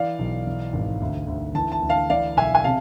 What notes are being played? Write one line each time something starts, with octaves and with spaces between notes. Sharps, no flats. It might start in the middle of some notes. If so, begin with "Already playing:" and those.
Already playing: E3 D5 F5
B1
E3
G#1
D2
D2
E3 A5
A5
D2
F5 A5
E3 D5 F5
B1 E5 G#5
G#5
C3 F5 A5